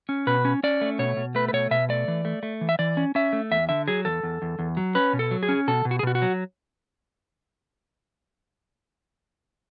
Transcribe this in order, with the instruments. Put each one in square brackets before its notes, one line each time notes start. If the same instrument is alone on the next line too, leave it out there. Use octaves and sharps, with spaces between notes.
[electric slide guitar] C#4
B2 B4
C#4
C#4 D5
A3
B2 C#5
B2
A3 B4
B4
B2 C#5
B2 E5
A3 D5
E3
A3
A3
E3
E5
E3 D5
C#4
C#4 E5
A3
E2 E5
D3 E5
F#3 G#4
E2 A4
E2
E2
E2
F#3
C#4 B4
B2
A4
F#3
G#4
C#4
B2 A4
B2
F#4
G#4
B2 F#4
F#4
F#3